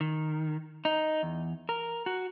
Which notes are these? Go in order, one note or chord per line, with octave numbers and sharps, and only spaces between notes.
D#3
D#4
E2
A#4
F#4